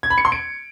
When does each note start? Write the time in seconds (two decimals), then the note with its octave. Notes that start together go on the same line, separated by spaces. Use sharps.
0.03 G#6
0.10 B5
0.18 C#7
0.25 C6
0.32 D7